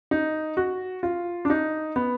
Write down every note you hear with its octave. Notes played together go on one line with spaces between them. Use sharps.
D#4
F#4
F4
D4
D#4
B3